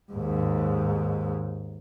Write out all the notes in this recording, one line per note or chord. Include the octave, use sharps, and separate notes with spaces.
D#2 G#2